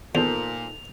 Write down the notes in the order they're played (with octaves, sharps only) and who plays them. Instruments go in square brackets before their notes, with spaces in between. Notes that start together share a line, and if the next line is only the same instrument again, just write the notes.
[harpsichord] E2 [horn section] A#2 [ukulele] D#4 A4 C5 [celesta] F7